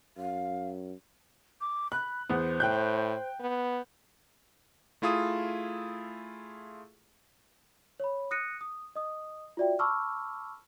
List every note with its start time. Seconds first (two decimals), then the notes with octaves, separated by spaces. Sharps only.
0.17 F#2 F5
1.61 D6
1.92 B5 F#6
2.29 E2 B3 C5
2.60 A2 G5 F#6 G6
3.40 B3
5.02 A3 E4 F4 G#4 D#6
8.00 C#5 B5
8.31 D#6 F#6 A#6 C#7 D#7
8.61 D#6
8.96 D#5 D#6
9.57 F4 F#4 D5 E5 G5
9.79 A5 B5 C#6 D6 E6 F6